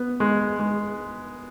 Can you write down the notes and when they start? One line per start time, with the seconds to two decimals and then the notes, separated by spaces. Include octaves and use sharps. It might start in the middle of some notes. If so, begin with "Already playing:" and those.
Already playing: B3
0.20 G#3
0.59 G#3